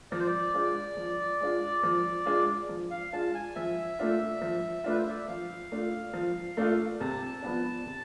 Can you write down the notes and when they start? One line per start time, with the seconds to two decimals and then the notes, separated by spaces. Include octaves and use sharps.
0.11 F3 D5
0.19 C5
0.27 D5
0.54 G#3 D4 F4
0.97 F3
1.40 G#3 D4 F4
1.83 F3
2.26 G#3 D4 F4
2.69 F3
2.91 F5
3.13 G#3 D4 F4 A5
3.34 G#5
3.55 F3 E5
3.99 A3 D4 F4
4.41 F3
4.84 A3 D4 F4 B4
4.99 C5
5.08 D5
5.18 E5
5.28 F3 F5
5.72 A3 D4 F4
6.13 F3
6.57 A3 D4 F4
7.00 C3 A5
7.42 F3 B3 D4
7.86 C3